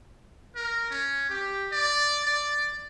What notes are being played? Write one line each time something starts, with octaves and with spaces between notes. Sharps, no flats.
A#4
C#4
G4
D5
D5